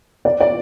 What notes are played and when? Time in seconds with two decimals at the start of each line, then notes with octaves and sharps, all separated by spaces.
0.25 D5
0.40 D5